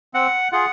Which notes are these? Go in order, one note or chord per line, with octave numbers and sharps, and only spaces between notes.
C4 F#5
F4 G#4 F#5